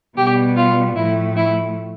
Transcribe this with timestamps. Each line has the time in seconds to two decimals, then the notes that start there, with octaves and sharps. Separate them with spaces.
0.17 B2 G3 B3 G4
0.57 F4
0.96 A2 F3 A3 E4
1.37 E4